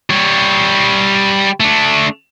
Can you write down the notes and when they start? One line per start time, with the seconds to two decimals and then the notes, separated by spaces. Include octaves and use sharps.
0.10 G3 C#5
1.60 A3 D4